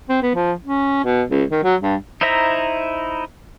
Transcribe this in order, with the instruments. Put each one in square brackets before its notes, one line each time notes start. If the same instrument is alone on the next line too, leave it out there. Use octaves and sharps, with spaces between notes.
[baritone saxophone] C4
B3
F3
C#4
B2
C#2
D#3
F#3
G2
[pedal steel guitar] D#4 E4 C5 E5 A#5